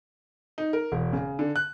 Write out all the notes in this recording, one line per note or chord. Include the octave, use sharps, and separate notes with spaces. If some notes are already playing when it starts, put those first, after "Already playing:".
D#4
A#4
E1
C#3
D3
F#6